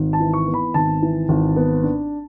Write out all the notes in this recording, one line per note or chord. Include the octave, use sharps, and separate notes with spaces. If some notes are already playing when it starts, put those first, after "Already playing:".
Already playing: G#1
A5
E3
C#6
B3
B5
G#1 A5
E3
G#1
B3
D4